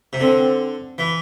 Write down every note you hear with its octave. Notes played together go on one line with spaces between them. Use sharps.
C3
D3 C4
E3